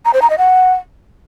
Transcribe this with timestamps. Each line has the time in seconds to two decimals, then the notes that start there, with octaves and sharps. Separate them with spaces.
0.05 A#5
0.14 C5
0.22 A#5
0.30 D#5
0.38 F#5